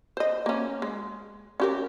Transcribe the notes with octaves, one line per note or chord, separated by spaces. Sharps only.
C5 D#5
A#3 C#4
G#3
C#4 G4 A#4